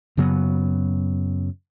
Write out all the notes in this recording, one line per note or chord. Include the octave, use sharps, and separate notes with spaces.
F#2 C#3 F#3 B3